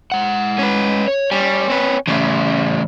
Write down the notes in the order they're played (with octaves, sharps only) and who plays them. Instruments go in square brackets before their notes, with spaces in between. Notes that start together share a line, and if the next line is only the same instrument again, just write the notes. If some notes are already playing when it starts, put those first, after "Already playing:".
[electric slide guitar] G#3 F#5
[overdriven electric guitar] C#4 B4
[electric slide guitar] C#5
[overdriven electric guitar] G3 [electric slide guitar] C#5 G5 G#5
[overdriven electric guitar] C4 B4
[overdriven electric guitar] C#3 G3 [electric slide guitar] E3 A3 E5